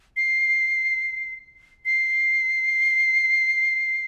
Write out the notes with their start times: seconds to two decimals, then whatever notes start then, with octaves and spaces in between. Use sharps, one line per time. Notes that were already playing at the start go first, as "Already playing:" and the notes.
0.17 C7
1.86 C7